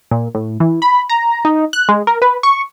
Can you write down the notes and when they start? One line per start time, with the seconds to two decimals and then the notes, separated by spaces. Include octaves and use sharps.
0.11 A#2
0.35 A2
0.60 E3
0.82 B5
1.10 A#5
1.45 D#4
1.73 F#6
1.89 G#3
2.07 A#4
2.22 B4
2.43 C#6